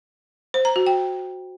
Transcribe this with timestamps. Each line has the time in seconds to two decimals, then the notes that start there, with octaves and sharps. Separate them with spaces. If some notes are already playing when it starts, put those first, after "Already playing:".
0.54 C5
0.65 A#5
0.76 F#4
0.86 G5